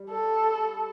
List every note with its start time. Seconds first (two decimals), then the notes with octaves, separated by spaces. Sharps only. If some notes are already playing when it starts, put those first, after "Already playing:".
Already playing: G3
0.10 A4